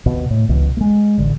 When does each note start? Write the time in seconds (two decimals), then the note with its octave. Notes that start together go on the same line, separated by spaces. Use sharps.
0.06 D#2 B2
0.30 A2
0.49 C#2 B2 E3
0.77 G#3 A3
1.18 A1 D3